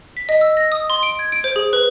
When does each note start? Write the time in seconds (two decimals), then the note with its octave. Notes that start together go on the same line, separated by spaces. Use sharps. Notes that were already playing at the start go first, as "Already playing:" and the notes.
0.17 B6
0.29 D#5
0.41 E6
0.57 A#6
0.72 D#6
0.90 C6
1.03 D7
1.19 G#6
1.32 D7
1.44 C5
1.56 G#4
1.73 B4